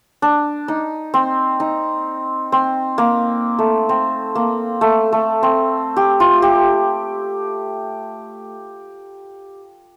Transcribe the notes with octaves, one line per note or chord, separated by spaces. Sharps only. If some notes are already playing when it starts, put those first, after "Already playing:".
D4
D#4
C4
D#4
C4
A#3
A3
C4
A#3
A3
A3
C4
G4
F4
G4